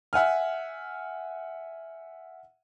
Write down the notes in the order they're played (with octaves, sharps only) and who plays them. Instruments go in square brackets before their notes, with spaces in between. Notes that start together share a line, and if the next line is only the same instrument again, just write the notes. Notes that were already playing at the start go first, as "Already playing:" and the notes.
[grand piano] E5 F#5 G#5 F6